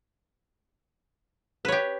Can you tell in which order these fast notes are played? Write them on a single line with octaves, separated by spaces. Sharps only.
B4 C#5 G4